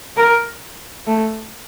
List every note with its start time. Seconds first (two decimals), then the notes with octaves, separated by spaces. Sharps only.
0.17 A#4
1.07 A3